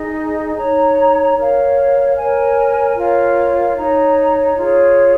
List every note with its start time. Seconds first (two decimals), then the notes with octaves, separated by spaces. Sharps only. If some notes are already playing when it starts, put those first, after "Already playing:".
Already playing: D#4 G#4 D#5
0.57 D#4 C#5 A#5
1.36 A#4 C#5 F5
2.17 A#4 C#5 G#5
2.97 F4 A#4 C#5 F5
3.77 D#4 C#5 A#5
4.56 F4 G#4 C#5